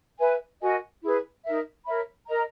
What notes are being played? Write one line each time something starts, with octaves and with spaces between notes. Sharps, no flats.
B4 E5 G#5
F#4 A#4 D#5 G#5
E4 G#4 B4
D#4 A#4 E5
A#4 C#5 E5 B5
A#4 D#5 A#5